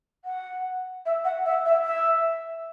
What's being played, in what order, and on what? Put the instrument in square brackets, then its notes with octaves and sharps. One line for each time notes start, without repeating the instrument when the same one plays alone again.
[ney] F#5
E5
F#5
E5
E5
E5